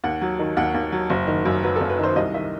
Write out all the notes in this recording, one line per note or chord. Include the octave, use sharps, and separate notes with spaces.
D#2 F#5
F#3
D#3
D#2 F#5
D#2
F#3
F#1
D#3
F#2
F#3 B4
F#1 A4
B4
D#3 C5
C2 D#5
D#3 E5